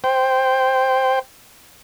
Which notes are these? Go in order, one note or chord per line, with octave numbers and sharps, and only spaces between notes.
C5 G5